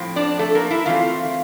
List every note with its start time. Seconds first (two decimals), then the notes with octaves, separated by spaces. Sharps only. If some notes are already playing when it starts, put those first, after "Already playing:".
Already playing: A2 F3 C4
0.16 D4 D5
0.39 A3 A4
0.55 A#3 A#4
0.70 E4 E5
0.86 E3 A3 C4 F4 F5